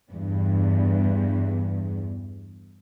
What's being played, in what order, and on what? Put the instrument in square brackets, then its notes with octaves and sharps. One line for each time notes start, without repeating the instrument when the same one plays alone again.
[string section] E2 G2